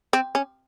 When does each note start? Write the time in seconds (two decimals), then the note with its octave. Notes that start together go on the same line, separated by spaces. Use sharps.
0.13 C4
0.35 C#4